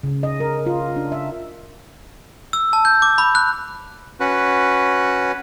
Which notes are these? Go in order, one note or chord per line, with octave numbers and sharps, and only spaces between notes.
C#3
D#5
A#4
F4
D4
E5
E6
A5
G6
D6
B5
F#6
C#4 F#4 B4